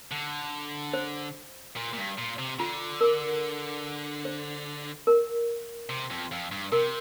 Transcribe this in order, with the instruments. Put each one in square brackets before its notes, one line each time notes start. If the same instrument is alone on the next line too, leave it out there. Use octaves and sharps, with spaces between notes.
[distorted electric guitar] D3
[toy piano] C5
[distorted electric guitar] A#2
A#2
G2
A#2
C3
[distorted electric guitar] D3 [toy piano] F4
[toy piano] A#4
C5
A#4
[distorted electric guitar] C3
F2
F2
G2
[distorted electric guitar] C3 [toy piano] A#4